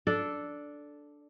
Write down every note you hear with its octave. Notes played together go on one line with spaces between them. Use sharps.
D4 A4 D5